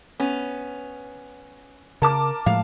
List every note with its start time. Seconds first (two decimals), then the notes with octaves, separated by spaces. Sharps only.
0.20 B3 C#4
2.02 C#3 A#4 A5 D6
2.46 A2 F3 G#3 F5